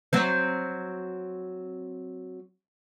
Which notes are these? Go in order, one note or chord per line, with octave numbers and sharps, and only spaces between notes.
F#3 C4 C5